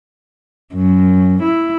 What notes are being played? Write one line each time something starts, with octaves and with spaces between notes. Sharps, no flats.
F#2
E4